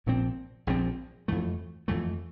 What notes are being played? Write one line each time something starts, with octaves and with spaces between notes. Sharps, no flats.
A#1 A#2 F3 C4
A#1 A#2 F3 C4
F2 E3 A3
F2 E3 A3